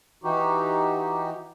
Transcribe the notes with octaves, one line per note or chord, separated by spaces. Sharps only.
E3 D#4 F#4 G4